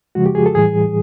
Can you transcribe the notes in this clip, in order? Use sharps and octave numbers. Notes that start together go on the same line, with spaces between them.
C#3 F3 G#3 F#4
G4
G#4
A4
A2 E3 G3 G#4